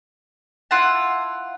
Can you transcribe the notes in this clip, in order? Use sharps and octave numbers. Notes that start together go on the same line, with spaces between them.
E4 F4 F#5 A5